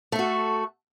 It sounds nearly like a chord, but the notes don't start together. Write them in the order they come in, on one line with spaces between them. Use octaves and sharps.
A3 A4 F#4